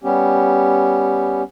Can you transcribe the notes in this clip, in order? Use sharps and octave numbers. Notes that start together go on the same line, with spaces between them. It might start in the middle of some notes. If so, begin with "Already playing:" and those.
G3 B3 C#4 G4